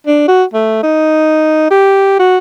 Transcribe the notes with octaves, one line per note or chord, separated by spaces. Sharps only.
D4
F#4
A3
D#4
G4
F#4